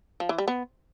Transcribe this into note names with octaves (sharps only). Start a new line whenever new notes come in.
F3
E3
G3
B3